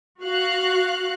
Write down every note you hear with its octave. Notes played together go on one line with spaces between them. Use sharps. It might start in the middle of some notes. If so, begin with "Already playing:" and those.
F#4 F5 F#6